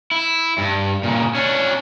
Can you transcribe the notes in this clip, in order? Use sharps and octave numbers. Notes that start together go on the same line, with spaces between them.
E4
G2
A#2 C#3
C#4 D4